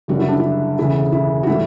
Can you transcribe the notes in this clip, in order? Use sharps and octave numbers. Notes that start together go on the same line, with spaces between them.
F#1 F#2 D3 G3 F#4
E4
D4
E4
E1 D2 C#3 E4
E4
F#4
A2 E3 G3 E4